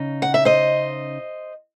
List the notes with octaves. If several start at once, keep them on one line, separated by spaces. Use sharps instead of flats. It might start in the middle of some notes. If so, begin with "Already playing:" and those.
Already playing: C#3 D#4
F#5
E5
C5 D#5